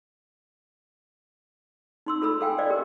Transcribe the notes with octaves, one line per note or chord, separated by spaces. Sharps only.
D#4 C6 E6
F4 A4 B5 E6
A4 F5 G5 G#5
C5 D5 D#5 F5
G4 A#4